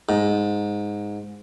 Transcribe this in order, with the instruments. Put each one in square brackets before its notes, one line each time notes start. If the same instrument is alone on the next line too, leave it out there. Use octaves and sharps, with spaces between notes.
[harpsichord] G#2